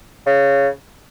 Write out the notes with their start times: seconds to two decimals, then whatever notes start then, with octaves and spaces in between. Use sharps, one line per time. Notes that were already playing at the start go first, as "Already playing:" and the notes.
0.26 C#3